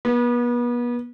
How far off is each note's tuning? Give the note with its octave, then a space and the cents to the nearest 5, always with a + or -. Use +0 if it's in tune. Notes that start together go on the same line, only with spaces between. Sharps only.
B3 -35